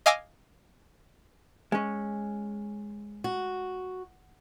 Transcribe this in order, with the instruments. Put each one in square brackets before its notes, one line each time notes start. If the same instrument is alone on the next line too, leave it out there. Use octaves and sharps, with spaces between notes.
[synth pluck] D#5 F5 G#5 D6 E6 A#6
[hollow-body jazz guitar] G#3 C#4
[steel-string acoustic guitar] F#4